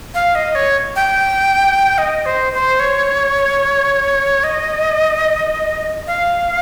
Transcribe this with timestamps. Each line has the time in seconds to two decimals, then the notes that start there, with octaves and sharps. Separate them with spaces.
0.14 F5
0.35 D#5
0.55 C#5
0.96 G5
1.98 D#5
2.26 C5
2.53 C5
2.80 C#5
4.44 D#5
6.07 F5